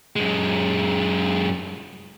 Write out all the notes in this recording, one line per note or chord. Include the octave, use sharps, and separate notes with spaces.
F#2 G#3